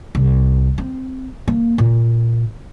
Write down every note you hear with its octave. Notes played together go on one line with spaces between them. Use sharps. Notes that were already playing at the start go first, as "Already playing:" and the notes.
C2
C4
A#3
A#2